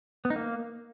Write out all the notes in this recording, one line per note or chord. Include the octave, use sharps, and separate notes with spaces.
B3
D#4
A#3